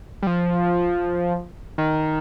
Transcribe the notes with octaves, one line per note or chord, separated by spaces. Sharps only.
G3
F3
D#3